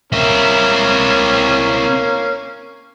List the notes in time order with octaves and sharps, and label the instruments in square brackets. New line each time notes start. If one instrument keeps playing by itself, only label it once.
[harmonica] A#3 C#4 [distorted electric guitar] C4 E4